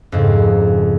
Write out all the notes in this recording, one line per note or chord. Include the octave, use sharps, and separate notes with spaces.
F2 G#2 C#3